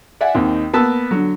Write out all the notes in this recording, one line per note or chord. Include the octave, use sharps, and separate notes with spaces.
D5 E5 F#5 G#5
D#2 D#3 C4
A#3 B3 A5 E6
D3 F#3